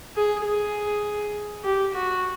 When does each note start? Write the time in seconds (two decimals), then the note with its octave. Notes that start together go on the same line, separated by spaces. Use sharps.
0.16 G#4
0.46 G#4
1.64 G4
1.95 F#4